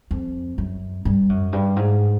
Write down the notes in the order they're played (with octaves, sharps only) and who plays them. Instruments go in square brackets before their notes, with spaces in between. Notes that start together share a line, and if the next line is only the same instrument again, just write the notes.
[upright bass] F2
F#2
G2
F#2
G2
G#2